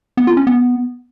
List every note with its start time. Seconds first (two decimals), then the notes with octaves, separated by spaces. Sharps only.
0.17 B3
0.27 F4
0.37 C#4
0.47 B3